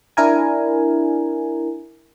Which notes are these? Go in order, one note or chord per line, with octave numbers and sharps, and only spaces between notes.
D4 E4 A#4 G#5